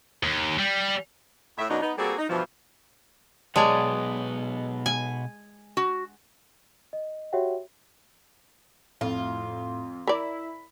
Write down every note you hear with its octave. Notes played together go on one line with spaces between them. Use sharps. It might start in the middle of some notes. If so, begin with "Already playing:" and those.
D#2
G3
A2 E5
F#2 B2 F#3 D4 D#4
B3 D#4
G3 A#3 C4 F#4 G#4 A4
D#4
G2 B2 E3 F3
B1 G#3 B3 C#5 D5 A5
G#5
F#4
D#5
F#4 G4 C#5 E5 F#5 G5
F2 A2 F4
E4 A#4 D5 B5